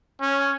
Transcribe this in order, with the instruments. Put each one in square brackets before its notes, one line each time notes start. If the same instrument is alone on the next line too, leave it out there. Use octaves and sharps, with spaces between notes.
[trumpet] C#4